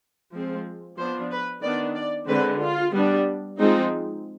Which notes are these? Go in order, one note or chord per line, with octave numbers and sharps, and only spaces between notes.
F3 G#3 C4
F3 B3 D4 C5
B4
D#3 B3 D4 D5
D5
D3 G#3 C4 B4
F4
G3 B3 D4
F3 G#3 C4 D#4